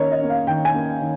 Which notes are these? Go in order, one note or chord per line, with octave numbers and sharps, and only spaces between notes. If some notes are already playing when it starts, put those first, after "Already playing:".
Already playing: D#3 A#3 C#4 A#4 C#5 D#5
D#5
A#3 C#4
F5
D#3 G5
G#5
A#3 C#4
D#3